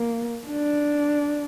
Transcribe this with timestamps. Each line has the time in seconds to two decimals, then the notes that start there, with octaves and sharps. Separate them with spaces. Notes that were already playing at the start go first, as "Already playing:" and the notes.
Already playing: A#3
0.48 D4